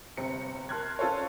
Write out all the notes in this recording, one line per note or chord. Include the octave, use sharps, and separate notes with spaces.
G1 C3 C4 C#7
A#4 A5 C6 F6 F#6 G#6
C#4 F4 A4 C5 C#5